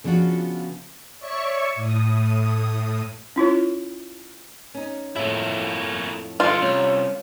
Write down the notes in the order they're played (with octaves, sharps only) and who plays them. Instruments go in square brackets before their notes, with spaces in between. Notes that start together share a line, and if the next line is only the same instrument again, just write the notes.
[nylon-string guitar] C#3 F3 B3 D4 F4 F#4
[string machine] C#5 D5 E5 C#6 C#7
A2 D#6
[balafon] C#4 E4 F4 C#5
[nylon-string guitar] C#4 D#4
[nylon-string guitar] F2 A2 [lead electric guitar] A#3 E4
[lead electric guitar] G2 D3 [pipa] F4
[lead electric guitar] C2 [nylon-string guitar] C#4 D5